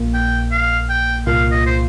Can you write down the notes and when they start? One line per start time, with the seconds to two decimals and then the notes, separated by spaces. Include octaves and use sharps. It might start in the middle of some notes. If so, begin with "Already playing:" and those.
Already playing: A#1 A#2 A#3
0.14 G5
0.52 F5
0.90 G5
1.26 C2 A#2 A#3 F4 F5
1.51 D#5
1.67 C5